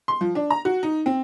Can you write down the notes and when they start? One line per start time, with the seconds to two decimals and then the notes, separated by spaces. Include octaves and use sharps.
0.08 C6
0.21 F3
0.35 D4
0.50 A#5
0.65 F#4
0.83 D#4
1.06 C4